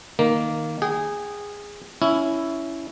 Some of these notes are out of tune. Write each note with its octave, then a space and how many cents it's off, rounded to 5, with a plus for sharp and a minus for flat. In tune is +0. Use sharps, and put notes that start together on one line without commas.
D#3 +0 A#3 +0
G#4 -15 G5 -35
C#4 +20 E4 +0